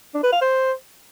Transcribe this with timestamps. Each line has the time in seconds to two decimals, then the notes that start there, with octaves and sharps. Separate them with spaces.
0.14 D4
0.23 B4
0.32 F5
0.41 C5